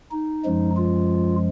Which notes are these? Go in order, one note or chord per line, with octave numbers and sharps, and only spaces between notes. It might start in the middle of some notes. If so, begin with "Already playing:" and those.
D#4
F#2 F3 G#3
F4